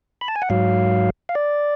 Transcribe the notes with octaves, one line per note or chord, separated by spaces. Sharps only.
B5
A5
G#5
F#5
G#2 F#3 F5
F5
D5